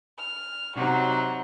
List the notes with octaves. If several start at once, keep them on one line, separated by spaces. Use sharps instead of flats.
F6
C3 F#3 D#4 F#4